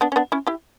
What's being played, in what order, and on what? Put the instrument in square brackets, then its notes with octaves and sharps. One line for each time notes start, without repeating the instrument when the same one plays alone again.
[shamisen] B3 D4
C#4
B3 D4
C#4 E4
E4 G4